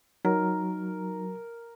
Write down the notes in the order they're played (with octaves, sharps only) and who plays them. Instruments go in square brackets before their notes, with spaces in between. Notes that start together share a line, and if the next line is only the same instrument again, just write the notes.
[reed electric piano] F#3 [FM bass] D#4 [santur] A#4